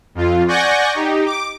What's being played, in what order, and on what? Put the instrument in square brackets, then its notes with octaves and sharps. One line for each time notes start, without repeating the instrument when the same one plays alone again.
[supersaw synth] F2 F4
D5 F#5 G#5 C#6 G6 A#6
D#4 G4
D6